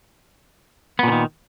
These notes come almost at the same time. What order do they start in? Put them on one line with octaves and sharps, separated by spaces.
B3 A#2 D3 D#3